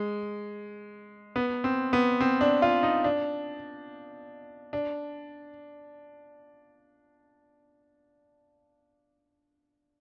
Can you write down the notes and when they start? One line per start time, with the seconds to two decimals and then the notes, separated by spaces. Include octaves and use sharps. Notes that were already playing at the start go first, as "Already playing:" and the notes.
Already playing: G#3
1.36 B3
1.64 C4
1.93 B3
2.21 C4
2.41 D4
2.62 F4
2.83 D#4
3.04 D4
4.73 D4